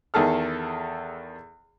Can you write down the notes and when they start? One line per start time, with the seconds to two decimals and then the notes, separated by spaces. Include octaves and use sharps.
0.14 E2 D#3 G#4 A4 F6